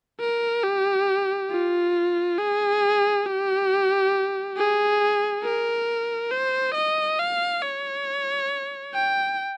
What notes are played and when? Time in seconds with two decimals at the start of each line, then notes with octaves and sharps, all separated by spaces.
0.20 A#4
0.63 G4
1.50 F4
2.38 G#4
3.26 G4
4.57 G#4
5.43 A#4
6.31 C5
6.74 D#5
7.19 F5
7.62 C#5
8.94 G5